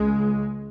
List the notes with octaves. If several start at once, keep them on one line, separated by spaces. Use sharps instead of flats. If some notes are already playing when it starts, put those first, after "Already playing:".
Already playing: C#2 C#3 G#3